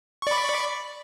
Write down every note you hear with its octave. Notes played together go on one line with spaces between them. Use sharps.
D5 B5 C#6